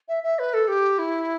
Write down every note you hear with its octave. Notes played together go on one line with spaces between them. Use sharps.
E5
E5
B4
A4
G4
E4